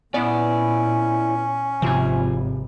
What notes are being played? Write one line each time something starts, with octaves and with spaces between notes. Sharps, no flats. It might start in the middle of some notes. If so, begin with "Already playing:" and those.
A#2 B3 C#4 E4 D5
G#1 C3 F3 F4 G#5